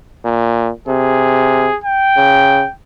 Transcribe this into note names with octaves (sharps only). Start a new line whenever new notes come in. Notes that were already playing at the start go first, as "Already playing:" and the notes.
A#2
C3 G#4
G5
C#3